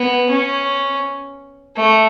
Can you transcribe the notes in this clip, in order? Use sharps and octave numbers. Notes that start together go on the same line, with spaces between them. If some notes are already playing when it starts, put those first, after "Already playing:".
Already playing: B3
C#4
A3